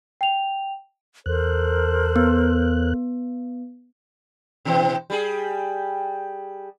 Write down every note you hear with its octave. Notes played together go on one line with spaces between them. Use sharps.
G5 F7
E2 A4 A#4 C5 F#6
B3
B2 E3 C4
G3 G#4